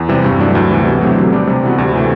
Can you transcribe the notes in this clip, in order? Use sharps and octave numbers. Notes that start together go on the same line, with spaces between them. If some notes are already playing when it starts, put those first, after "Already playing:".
Already playing: E2
C3 E3 G3
G2
F#3 A3 D4
D2
C3 E3 G3
B2
F#3 A3 C4 G4
D3
G3 D4 G4
C3
E3 G3 B3 F#4
D2
C3 E3 A3